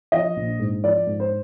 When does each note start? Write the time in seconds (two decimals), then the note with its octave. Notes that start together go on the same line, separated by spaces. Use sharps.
0.12 F3 D#5
0.36 A#1
0.60 G#2
0.84 F3 D5
1.07 G#2
1.20 C5